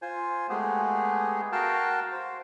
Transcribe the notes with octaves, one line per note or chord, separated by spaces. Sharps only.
F4 C5 G#5
G#3 A3 B3 G4 G#4
F#4 A#4 F5 G5 A5
C5